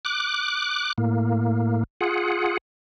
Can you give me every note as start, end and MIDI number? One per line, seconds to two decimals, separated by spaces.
0.05 0.93 86
0.05 0.93 90
0.98 1.84 45
0.98 1.84 58
2.01 2.57 65
2.01 2.57 68
2.01 2.57 78